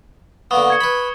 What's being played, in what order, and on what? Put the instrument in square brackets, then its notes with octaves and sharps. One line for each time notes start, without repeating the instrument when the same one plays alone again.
[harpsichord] D3 A#3 B3 [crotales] C#6 D#6 G7
[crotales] D#6 G#6 C#7
[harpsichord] B4 B5